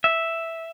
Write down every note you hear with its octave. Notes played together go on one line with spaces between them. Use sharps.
E5